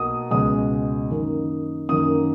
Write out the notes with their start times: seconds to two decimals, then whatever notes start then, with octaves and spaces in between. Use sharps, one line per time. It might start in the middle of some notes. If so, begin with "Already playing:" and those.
Already playing: B1 B2 A#3 D#6
0.31 C#2 B2 G#3 D#6
1.10 F#2 D#3 A#3
1.89 F#2 D#3 A#3 D#6